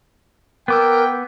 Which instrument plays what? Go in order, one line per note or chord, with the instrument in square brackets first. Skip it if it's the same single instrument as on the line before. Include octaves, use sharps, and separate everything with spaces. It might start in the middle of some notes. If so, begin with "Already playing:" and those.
[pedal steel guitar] B3 D6 E6 [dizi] A#4 [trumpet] G5